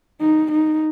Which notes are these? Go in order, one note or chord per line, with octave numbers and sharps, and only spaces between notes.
D#4
D#4